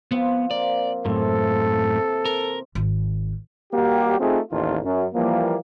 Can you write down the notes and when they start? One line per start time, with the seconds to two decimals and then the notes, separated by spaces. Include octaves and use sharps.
0.11 F3 B3 C4 F#5
0.51 A#3 D5
1.05 F#2 A2 C3 E3 C4 A4
2.25 A#4
2.75 G#1
3.74 G3 A#3 F#4 G4
4.20 A3 C4 D#4 F4 G#4
4.52 A1 D#2 F4
4.83 F#2
5.15 E3 F3 G3 A#3